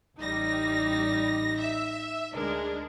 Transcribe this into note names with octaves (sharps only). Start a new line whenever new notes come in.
A1 G3 D#4 A#6
E5
D2 G#3 D4 A#4